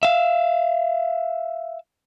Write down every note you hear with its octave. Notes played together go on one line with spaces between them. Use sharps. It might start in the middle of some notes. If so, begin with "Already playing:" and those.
E5 F5